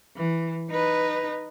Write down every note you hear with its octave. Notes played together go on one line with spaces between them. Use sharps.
E3
D#4 B4